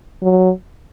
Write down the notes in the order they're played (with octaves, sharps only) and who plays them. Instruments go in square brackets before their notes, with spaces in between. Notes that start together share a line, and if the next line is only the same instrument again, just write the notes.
[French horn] F#3